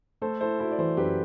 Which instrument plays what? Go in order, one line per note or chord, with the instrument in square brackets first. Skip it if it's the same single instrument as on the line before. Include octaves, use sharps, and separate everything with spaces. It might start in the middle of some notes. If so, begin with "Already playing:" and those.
[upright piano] A3 [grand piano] A4 C5
[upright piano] E4 [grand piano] A4 C5
[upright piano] E4 [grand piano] F#4 A4
[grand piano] D5
[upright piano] E3 [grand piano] A4 C5
[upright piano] F#2 [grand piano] G4 B4